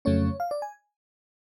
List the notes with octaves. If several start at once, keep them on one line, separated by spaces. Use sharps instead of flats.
F2 C#3 F#3 A3 C#4 C#5
F5
D5
G#5